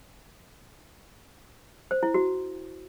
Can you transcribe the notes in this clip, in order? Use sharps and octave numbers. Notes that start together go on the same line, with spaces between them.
C5
E4
F#4